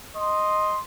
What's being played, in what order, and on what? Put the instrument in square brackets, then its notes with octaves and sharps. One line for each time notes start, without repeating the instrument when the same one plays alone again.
[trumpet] D#5 [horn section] C6